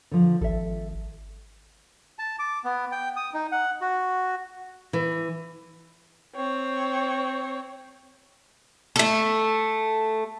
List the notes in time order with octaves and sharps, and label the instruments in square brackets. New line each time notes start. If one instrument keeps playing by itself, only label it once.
[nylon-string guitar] D3 F3
[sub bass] G#1 [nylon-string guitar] A4 E5
[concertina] A5
D6
B3
G5
D#6
D#4
F#5
F#4
[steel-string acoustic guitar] E3
[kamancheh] C4 C#5
[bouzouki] A3 A4